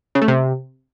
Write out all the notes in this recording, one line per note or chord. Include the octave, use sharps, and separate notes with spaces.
C#3
A3
C3